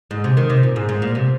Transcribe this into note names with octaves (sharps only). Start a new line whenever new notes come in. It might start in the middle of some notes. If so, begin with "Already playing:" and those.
G#2
C3
D#3
C3
A#2
G#2
G#2
A#2
C3